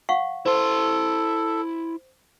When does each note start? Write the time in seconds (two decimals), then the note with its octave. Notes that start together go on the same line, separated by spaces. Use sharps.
0.09 F5 F#5 C#6
0.46 E4 A4 C5 C6